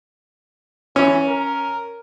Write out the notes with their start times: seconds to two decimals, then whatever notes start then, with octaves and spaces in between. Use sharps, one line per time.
0.96 E3 C#4
1.28 A#4